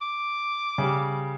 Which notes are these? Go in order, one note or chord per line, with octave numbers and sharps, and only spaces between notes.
D6
C#3 G3